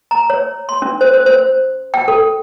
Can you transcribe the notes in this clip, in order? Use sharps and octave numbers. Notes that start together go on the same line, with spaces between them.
A#5
C#5
C6
C#4
C5
C5
C5
G5
A4